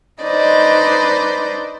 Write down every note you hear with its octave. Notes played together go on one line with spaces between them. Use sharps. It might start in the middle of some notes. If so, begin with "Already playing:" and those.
D4 D#4 B4 C5 D5 D#5